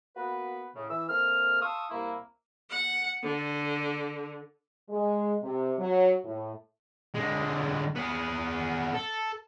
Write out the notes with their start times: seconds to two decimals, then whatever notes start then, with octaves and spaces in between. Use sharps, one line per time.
0.17 A#3 B3 F#4 B4
0.76 A2 C#3
0.90 E3 E6
1.09 A3 A#3 C4 F6
1.62 F5 A5 C6 C#6 D#6 E6
1.91 C2 A#3 E4
2.70 F#5
3.23 D3
4.90 G#3
5.43 C3
5.79 F#3
6.24 A2
7.15 D3 G#3
7.96 B3 G#4
8.95 A4